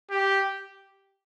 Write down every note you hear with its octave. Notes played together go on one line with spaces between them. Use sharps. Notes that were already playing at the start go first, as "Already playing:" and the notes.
G4